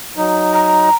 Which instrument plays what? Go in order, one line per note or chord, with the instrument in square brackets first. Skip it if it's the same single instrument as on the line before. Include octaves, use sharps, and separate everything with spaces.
[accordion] F#3 D#4
[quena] A#5